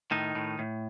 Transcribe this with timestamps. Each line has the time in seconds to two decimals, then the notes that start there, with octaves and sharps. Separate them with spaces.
0.11 A2 D#3 D#4
0.35 A2
0.59 A2